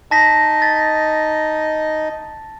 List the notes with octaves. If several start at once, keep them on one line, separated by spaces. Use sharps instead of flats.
D#4 D#5 A5 A#6 B6
A6 B6